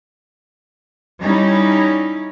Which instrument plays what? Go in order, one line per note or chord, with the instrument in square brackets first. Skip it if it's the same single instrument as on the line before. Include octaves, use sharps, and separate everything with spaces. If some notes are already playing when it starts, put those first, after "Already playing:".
[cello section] G3 C#4 D#4 E4